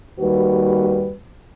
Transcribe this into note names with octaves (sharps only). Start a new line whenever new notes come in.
D#2 G3 F#4 B4